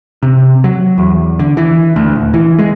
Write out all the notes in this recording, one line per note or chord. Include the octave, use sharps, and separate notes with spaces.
C3
F#3
E2
D3
E3
D2
D#1
E3
G#3